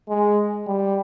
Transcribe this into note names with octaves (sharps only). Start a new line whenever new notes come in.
G#3
G3